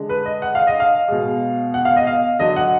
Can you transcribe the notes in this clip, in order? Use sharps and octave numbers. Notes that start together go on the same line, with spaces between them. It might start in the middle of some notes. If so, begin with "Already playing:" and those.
Already playing: D3 G#3
B4
D#5
F#5
F5
D#5
F5
B2 G#3
F#5
F5
D#5
F5
D3 F#3 D#5
F#5